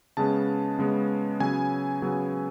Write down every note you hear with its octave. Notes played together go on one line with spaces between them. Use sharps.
C#3 G#3 B3 A5
C#3 G#3 B3
C#3 F#3 B3 G#5
C#3 F#3 B3